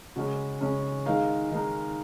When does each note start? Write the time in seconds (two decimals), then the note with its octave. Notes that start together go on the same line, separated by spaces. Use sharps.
0.16 C#3 G#3 C#4 F#4
0.61 C#3 G#3 C#4
1.06 D#3 G#3 D#4 F5
1.51 D#3 G#3 D#4